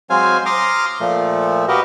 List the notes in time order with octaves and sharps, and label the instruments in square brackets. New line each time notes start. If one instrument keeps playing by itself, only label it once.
[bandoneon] F#3 G#3 C4 C5 F5 G#5
A#5 C6 D6 D#6 F6
A#2 F3 A3
F#4 G4 A#4 B4 D#5